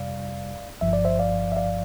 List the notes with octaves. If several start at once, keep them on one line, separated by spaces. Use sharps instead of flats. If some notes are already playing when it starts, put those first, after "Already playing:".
Already playing: F2 C3 G3 D5 F5
G1 G2 F3 E5
D5
C5 E5
D5 F5
E5
D5 F5